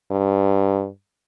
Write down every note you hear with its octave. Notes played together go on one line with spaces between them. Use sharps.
G2